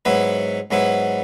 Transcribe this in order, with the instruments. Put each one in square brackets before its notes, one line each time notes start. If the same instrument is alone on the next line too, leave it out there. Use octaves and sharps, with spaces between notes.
[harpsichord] G#2 F#3 B3 E4 B4
G#2 F#3 B3 E4 B4